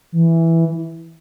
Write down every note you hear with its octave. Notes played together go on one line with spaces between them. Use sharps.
E3